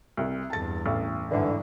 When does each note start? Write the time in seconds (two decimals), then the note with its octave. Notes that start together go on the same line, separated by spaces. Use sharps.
0.17 C2
0.50 E2 G2 A5 A6
0.86 A1
1.31 G1 G#2 D3 E3